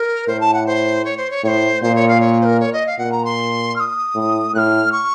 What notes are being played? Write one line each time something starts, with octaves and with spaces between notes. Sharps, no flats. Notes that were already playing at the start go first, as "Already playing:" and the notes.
Already playing: A#4
A2 C5
A5
F#5
C5
C#5
C5
C#5
A2 C5 C#5
A#2 C5
C#5
F5
C#5
C5
A#4
C#5
D#5
F5
A#2 F#5
A#5
C6
F6
D#6
A2
A2 F6 F#6
C#6